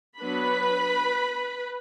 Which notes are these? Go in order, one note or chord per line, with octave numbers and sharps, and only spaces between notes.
F#3 B3 D4 B4 B5